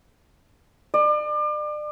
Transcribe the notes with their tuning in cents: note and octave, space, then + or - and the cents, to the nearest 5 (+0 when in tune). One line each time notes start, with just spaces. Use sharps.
D5 +35